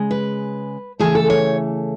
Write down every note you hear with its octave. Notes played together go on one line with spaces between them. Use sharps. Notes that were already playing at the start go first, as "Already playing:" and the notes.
Already playing: C#3 G#3
B4
C#3 E3 A3 G#4
A4
C#5